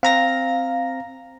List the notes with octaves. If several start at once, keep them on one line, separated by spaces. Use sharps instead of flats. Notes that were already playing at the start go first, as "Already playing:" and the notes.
C4 F5 A#5 A#6